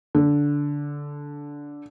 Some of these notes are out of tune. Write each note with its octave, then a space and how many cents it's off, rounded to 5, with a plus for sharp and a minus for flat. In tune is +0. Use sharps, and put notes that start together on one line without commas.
D3 -15